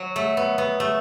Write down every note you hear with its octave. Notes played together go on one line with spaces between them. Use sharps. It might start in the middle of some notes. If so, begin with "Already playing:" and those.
Already playing: F#3
A3
B3
B3
A3